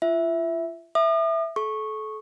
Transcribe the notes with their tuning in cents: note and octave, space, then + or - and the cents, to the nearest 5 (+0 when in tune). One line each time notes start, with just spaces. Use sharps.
F4 -40 E5 +0
E5 +0 D#6 -45
A4 -30 C#6 -10